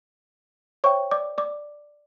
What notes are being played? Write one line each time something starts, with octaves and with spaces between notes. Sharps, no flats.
C5 C#5 E5 G5 C#6
D5 D6
D5 D6